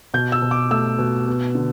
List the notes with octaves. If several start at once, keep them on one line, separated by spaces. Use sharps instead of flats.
B2 G6
E6
B2
D6
A3 E6
B2
B3
D3